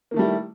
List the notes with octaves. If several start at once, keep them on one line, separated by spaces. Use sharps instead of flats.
D#3 G3 A3 A#3 E4